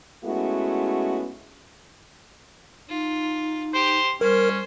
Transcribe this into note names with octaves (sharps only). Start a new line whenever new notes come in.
G#3 A3 B3 C#4 E4 F#4
D#4 F4
G4 C5
G3 C#4 A#4 C5